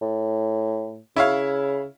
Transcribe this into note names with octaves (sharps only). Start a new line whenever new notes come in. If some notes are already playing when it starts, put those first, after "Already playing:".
A2
C#3 E4 C#5 F5